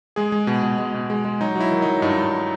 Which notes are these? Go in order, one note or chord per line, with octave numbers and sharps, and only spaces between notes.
G#3 G#4
G#3
B2
B2
G#3
B2
G#3
G#3
F#3 D#4
F#3 E4
D#3
F#3 D#4
G2 D#4
G2